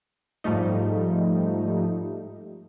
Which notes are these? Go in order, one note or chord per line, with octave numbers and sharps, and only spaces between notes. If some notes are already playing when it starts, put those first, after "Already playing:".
G#2 F3 G3 A3 D#4